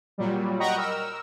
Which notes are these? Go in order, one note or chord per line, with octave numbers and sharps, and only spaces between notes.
A#2 F#3 G3
D#5 F#5 G5 A#5 B5 C#6
A#4 E6